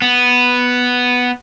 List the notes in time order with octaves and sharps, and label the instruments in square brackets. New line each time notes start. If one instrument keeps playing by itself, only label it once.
[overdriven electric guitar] B3